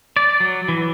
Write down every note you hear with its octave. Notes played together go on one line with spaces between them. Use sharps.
D5
F#3
E3